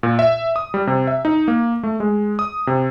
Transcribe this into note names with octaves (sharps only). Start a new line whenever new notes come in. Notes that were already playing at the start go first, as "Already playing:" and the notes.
A#2
E5
D#6
G3
C3
E5
D#4
A#3
A3
G#3
D#6
C3